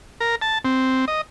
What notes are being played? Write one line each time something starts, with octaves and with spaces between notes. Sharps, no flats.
A#4
A5
C4
D#5